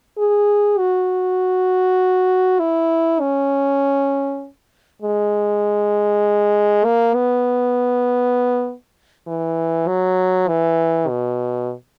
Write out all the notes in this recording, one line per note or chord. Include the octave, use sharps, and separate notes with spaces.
G#4
F#4
E4
C#4
G#3
A#3
B3
E3
F#3
E3
B2